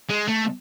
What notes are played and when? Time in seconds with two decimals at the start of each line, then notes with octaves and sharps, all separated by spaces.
0.10 G#3
0.28 A3